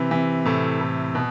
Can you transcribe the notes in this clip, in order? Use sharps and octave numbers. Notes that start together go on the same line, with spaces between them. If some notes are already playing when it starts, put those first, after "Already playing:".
Already playing: C3 E3
C3 E3
A2 C3
A2
B2